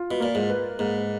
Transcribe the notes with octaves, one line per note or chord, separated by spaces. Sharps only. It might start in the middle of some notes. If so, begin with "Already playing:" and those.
Already playing: F4
B2
A#2 A#3
G#2
B4
G#2 A#3